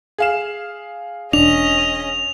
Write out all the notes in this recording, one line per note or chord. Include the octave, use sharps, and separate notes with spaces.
G#4 F5 E7
E1 C#4 D4 D#5 F7